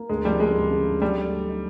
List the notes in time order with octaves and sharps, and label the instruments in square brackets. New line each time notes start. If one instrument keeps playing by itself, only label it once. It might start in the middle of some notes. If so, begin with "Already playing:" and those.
Already playing: [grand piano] A#3
[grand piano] D2 [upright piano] G#3
[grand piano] F3 [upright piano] G3
[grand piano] C#3 [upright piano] G#3
[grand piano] D2
C#3
D2
[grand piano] F#3 [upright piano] G3
[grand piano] A3
A3
D#4